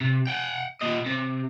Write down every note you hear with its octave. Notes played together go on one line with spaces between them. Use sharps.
C3
F#5 G5
A#2 D#5
C3